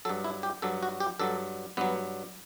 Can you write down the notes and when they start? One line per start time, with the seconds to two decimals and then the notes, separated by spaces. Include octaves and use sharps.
0.05 G2 F#3 A4
0.24 E4
0.43 G4
0.62 G2 F#3 A4
0.83 F#4
1.00 G4
1.20 G2 F#3 A4
1.77 G2 F#3 B3